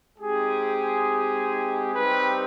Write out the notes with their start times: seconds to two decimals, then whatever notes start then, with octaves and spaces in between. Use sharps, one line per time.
0.18 G#3 C4 D#4 G4 G#4
1.95 G3 C4 D#4 G4 B4